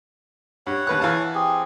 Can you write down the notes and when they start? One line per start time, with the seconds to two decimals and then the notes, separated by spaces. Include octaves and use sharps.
0.67 G2 C#5 F#5
0.87 D#2 B4 F#6
1.00 E3 F5 A5
1.35 C4 G4 G#4